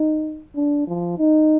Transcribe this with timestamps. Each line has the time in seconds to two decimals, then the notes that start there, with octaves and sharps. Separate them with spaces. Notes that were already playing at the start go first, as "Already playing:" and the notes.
Already playing: D#4
0.56 D4
0.87 F3
1.18 D#4